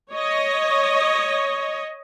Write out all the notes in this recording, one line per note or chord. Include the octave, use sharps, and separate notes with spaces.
C#5 D#5